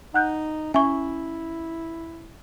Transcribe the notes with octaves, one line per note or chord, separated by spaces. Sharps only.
D#4 F#5 F#6 G6
C#4 E4 E5 G#5 C#6